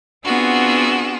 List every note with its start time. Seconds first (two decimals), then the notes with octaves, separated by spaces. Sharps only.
0.24 B3 C4 D4 F4 F#4 G#4